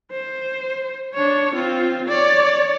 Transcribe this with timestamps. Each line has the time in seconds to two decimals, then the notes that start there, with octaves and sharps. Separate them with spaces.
0.12 C5
1.14 D4 C#5
1.54 C4 F4
2.09 C#5 D5